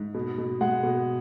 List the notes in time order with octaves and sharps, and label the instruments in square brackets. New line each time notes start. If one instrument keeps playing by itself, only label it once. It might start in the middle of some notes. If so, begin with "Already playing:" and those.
Already playing: [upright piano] G#2
B2
B2
G#3 F#5
B2